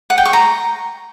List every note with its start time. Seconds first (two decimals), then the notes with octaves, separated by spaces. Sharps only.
0.10 F#5
0.18 G5
0.25 C#6
0.33 A#5